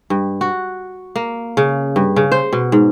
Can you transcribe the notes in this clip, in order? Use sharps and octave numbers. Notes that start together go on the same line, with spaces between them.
G2
F#4
A#3
C#3
G2
C#3
C5
B2
G#2